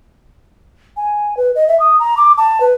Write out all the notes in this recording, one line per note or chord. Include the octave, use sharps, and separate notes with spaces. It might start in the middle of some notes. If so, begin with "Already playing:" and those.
G#5
B4
D#5
E5
D#6
A#5
D6
A5
B4